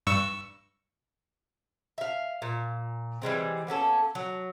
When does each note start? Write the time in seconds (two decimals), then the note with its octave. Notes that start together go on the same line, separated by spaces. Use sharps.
0.07 G2 C#6 E6
1.98 E5 F5
2.42 A#2
3.22 E3 G3 G#3 C4
3.67 A#3 B3 C#4 A4
4.15 F#3